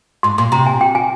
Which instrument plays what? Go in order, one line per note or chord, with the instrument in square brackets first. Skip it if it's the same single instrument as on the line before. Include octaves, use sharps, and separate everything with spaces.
[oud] G#2 [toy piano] C6
[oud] A#2 [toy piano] C6
[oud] C3 [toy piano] A#5
[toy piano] G#5
G5
G#5